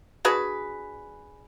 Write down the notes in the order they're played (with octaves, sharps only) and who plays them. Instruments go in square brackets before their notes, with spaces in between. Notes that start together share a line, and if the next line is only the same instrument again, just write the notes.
[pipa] D4 F#4 G#4 B4